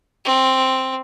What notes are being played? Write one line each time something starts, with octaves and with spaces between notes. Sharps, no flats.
C4